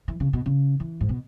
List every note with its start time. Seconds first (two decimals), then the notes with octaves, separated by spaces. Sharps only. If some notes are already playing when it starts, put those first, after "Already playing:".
0.08 E3
0.20 C#3
0.33 B2
0.46 C#3
0.80 E3
1.01 G#2
1.09 B2